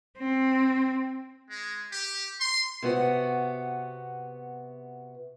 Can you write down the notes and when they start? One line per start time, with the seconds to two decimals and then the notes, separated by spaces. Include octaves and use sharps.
0.18 C4
1.50 G#3
1.92 G4
2.40 C6
2.83 C3 B3 F#4